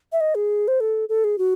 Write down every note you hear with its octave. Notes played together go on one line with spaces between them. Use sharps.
E5
D#5
G#4
C5
A4
A4
G#4
F#4